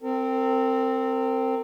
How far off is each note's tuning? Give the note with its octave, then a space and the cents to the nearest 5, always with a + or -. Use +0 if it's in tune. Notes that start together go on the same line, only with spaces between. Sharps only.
C4 +0 A#4 -40